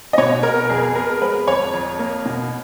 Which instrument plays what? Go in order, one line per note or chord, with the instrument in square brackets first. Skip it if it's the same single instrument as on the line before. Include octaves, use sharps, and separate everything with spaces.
[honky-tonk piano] D#5
B2 C#5
B3 A#4
F2 G#4
B3 A#4
G#3 B4
F2 C#5
F2
A#3
B2